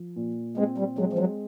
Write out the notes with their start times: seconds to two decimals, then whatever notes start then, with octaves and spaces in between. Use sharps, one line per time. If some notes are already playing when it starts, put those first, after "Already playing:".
Already playing: F3
0.16 A#2
0.57 G#3 C4
0.78 G3
0.98 F#3 G#3
1.13 F3
1.19 F#3